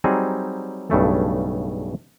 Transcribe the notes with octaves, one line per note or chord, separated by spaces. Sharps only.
F#3 G3 C4 D#4 G#4
B1 G2 C#3 A3 A4